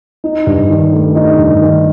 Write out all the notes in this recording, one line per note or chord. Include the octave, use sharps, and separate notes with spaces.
D#4
G2
D#3
A3
D#4
G2
D#3